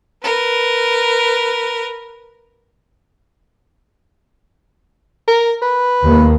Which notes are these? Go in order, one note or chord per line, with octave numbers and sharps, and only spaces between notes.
A#4 B4
A#4
B4
D#2 A#3